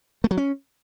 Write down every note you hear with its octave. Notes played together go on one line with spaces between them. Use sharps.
A3
F#3
C#4